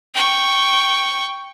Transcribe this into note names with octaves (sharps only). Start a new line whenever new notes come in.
G5 C#6